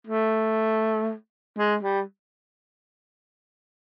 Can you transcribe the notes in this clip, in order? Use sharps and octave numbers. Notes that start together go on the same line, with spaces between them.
A3
G#3
G3